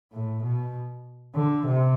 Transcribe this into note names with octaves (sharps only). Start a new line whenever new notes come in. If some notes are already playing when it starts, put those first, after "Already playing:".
A2
B2
D3
C3